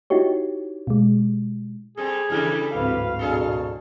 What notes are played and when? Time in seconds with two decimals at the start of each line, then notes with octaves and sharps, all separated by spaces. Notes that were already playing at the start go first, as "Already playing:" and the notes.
0.10 D#4 E4 F#4 G4 C#5
0.87 B2 G#3
1.97 G3 C4 G#4 A4
2.30 C#3 E3 G3 C#4 E4 A4 F6
2.74 D1 G#1 C4 B4 F5
3.19 B2 D4 G#4 A4